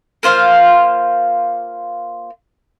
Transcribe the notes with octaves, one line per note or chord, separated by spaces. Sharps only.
A#3 F4 C5 F5